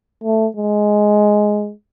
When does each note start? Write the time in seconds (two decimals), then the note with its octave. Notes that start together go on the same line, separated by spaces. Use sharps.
0.24 A3
0.57 G#3